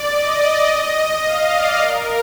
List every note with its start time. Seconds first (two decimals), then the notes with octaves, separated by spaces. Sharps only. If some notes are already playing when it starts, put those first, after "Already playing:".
Already playing: D5
0.11 D#5
1.23 F5
1.50 D5
1.79 A#4